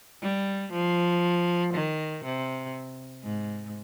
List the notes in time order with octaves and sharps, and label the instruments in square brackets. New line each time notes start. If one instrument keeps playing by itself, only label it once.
[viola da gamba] G3
F3
D#3
C3
G#2